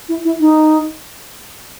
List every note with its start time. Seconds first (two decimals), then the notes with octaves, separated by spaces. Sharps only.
0.09 E4
0.25 E4
0.40 D#4